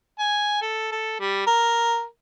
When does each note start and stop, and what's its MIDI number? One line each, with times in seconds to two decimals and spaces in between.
0.19 0.57 80
0.61 0.88 69
0.92 1.17 69
1.20 1.44 55
1.47 2.05 70